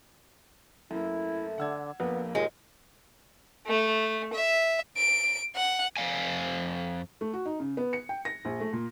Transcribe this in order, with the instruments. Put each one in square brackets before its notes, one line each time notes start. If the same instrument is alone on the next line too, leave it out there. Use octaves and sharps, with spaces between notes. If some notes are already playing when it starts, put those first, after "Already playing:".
[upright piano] F#2 A#3 [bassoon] A3 [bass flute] E4
[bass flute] D3 [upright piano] F#5 E6 G#6
[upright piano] A#1 F2 [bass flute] A#3 [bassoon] B3
[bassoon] D#2 [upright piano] A#2 A#3 D#4 [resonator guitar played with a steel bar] G#3
[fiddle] A3
E5
[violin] D7
F#5
[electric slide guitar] F2 A3 F5 G#5
[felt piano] A3
F#4
D#4
C#3
B3
C#7
G5
A#6
A#1
A3
A#2